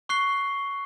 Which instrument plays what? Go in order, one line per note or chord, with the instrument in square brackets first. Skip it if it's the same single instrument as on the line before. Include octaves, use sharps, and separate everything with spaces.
[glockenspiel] C#6 F#6 C7 G7